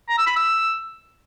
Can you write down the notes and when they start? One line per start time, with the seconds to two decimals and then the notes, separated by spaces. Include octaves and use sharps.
0.09 A#5
0.18 E6
0.27 B5
0.36 E6